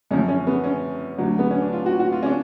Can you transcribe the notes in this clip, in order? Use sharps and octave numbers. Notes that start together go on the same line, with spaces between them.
F#2 F3 C#4
C#4
B3
C#4
D2 D3 F#3
B3
C#4
D4
F4
F#4
F#4
F4
C#4
D4